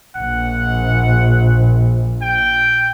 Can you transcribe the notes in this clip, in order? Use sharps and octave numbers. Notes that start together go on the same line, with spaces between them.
A#1 F#5
G5